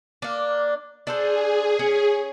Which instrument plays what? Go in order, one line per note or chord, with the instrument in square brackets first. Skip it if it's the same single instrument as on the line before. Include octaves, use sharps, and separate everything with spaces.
[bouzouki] A#3 D4
[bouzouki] D4 A4 C5 [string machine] G#4
[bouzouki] C#4